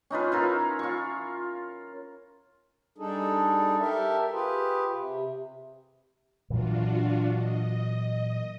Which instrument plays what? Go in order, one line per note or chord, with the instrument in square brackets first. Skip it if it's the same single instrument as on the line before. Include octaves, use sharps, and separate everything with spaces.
[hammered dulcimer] C#4 D#4 F4 B4
E4 F4 A#4
F4 C#6
[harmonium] G3 D4 D#4 G#4 A4
G4 A4 A#4 E5
F4 G4 G#4 B4
C3
[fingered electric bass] A#2 E3 F#3 [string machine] D4 F4 F#4
[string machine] D#5